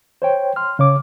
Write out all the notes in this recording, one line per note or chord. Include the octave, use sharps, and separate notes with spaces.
C5 C#5 G5
C6 F6
C#3 C#5 D6